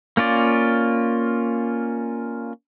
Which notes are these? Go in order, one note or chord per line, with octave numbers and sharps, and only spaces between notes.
A#3 C#4 F4 D5